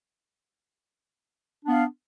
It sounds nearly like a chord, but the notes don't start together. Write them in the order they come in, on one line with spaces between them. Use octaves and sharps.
D4 B3 F5